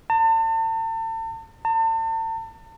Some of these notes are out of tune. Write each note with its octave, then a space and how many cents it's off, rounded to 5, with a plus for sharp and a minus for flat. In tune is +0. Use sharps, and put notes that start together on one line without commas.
A5 +40
A5 +40